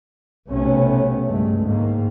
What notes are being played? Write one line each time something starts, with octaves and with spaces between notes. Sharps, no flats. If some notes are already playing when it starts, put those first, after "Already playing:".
B1 C3 A3 B3 C#4
C#2 G2 G#3 A3
G#2 D#3 A#3